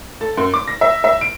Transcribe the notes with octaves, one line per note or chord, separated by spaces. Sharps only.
A4
F#2
D6
A#6
E5
E5
D7